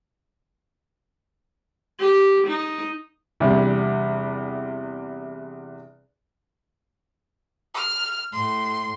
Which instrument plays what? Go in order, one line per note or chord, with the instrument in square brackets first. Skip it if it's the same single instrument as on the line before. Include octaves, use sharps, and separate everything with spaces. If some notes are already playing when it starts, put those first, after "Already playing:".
[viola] G4
D#4
[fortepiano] E2 C3 G3 D4
[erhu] F6
[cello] A2 [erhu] C6